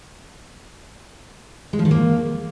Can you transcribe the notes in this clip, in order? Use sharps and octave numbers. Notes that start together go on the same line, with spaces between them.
G#3
F3
D#3
A#3